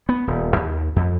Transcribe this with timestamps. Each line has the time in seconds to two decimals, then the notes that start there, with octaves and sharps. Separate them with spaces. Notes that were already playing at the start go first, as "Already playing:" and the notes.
0.09 B3
0.27 D#1
0.56 D#2
0.96 F2